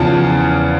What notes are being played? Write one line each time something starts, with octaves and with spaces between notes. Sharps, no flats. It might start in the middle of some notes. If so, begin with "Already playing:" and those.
Already playing: E2 C#3 F3 A5